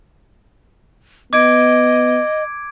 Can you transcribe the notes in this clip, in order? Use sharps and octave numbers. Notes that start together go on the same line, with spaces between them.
B3 D#5 D6 G#6 D7